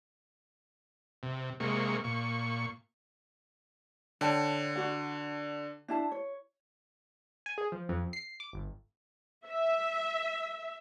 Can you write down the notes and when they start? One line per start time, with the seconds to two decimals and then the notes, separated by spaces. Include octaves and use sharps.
1.23 C3
1.60 C3 G#3 A#3 C#6
2.04 A#2 C#6
4.21 D3 C#5 G5 A5
4.76 D4 F#4 F#5
5.88 D4 E4 A5
6.11 C#5
7.46 G#5
7.58 G#4
7.72 F3
7.89 F2
8.13 C7
8.40 D6
8.53 G1
9.47 E5